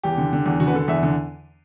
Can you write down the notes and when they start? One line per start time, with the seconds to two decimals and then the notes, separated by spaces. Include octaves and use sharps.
0.04 E2 G4
0.18 D3
0.33 D3
0.46 E2
0.60 D3 F#4
0.68 B4
0.74 D3 A4
0.88 E2 E5
1.03 D3